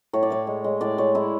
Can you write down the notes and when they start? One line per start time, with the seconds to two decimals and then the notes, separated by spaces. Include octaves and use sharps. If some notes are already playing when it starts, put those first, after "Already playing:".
0.13 A2 C#5
0.23 D5
0.30 A2 C#5
0.47 G#3
0.64 G#3
0.81 A2 D5
0.98 G#3 C#5
1.15 G#3 E4